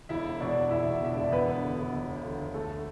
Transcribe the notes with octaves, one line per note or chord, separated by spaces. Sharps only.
E1 E4 E5
E1
B2 D4 D5
E1
E1 E4 E5
B2
E1 E5
D4 D5
E1
E1 B3 B4
D3
D2
E1
E1
D2
D2
D2
D3 A3 A4